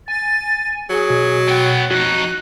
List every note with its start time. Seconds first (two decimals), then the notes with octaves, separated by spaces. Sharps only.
0.08 G#5 A6
0.90 F#3 G#4
1.10 B2
1.49 B3 F#5 G5
1.91 F2 D#4 F#4 F#6